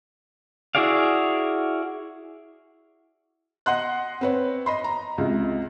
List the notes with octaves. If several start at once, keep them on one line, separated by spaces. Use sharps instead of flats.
E4 F#4 G#4 D5 F5
D#5 F#5 C6 F#6
C4 B4 C#5
D#5 B5 C6
A#5
C#2 C3